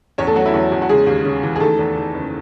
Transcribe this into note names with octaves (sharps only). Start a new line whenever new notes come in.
E2 C#4 C#5
A3 A4
F#3 F#4
E4
E2 F#3 F#4
E2
F#4
C#3 G#3 G#4
D#2
C#3
E3
G#4
D#3 A3 A4
E2
D#3
F#1